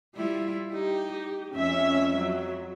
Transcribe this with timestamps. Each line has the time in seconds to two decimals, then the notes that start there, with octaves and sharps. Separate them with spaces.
0.14 G3 E4 F4
0.73 D#4 G4
1.55 F2 C#4 E5
2.17 F#3